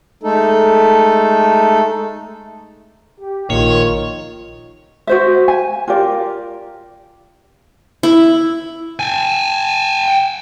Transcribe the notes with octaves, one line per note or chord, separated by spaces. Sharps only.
G#3 A3 D#4 A4
G4
A#1 A#2 D#3 F4 C#5
F#4 C5 E5
G#5
F4 G4 A#4 D5
E4
G5 G#5